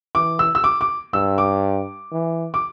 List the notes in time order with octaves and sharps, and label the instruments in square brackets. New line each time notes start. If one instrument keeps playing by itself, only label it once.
[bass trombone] E3 [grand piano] D6
[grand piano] E6
E6
D6
D6
[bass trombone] G2 [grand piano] E6
[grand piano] D6
[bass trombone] E3
[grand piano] D6